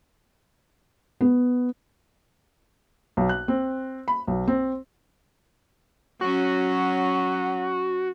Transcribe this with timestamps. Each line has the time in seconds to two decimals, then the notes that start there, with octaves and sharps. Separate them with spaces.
1.21 B3
3.17 B1
3.29 F#6
3.48 C4
4.08 B5
4.27 B1
4.48 C4
6.21 F#3 C#4 F#4